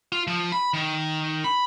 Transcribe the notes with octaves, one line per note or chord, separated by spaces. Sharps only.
F4
F3
B5
D#3
B5